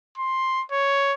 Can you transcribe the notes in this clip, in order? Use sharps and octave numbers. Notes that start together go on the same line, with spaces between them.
C6
C#5